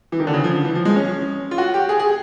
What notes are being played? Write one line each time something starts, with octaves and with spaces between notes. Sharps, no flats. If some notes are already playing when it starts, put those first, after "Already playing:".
E3
D#3
D3
C#3
F3
E3
F3
G#3
C#4
F4
F#4
G4
G#4
G#4